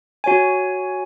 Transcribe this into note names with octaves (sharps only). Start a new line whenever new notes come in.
F#4 C#5 G#5